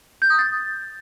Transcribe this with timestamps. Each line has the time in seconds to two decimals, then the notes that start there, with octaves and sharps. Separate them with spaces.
0.22 G6
0.30 D#6
0.38 A6